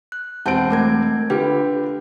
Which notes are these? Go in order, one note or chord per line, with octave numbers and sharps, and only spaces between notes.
F#6
E1 C4 F#5 A5 G6 D7
A3 A#4 G#6
D3 F4 G4 B4